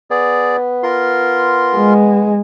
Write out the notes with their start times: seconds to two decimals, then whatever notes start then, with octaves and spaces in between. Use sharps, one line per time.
0.11 B3 G#4 D5
0.83 F4 A#4 C6
1.76 G#3